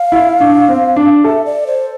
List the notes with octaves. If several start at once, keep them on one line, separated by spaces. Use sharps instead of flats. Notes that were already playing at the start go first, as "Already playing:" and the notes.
Already playing: F5
E4
D4
C4
D4
A4 E5
D5
C5